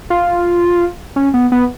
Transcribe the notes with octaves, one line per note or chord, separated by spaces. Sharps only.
F4
C#4
B3
B3